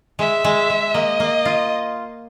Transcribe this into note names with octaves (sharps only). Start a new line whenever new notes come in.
G#3 E5
G#3
G#3
A#3 D#5
A#3
F4